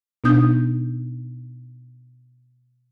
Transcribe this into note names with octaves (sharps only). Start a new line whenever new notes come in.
B2 B3 D4 D#4 D#6 G6